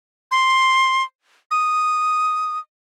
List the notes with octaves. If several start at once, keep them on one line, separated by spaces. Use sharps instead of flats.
C6
D#6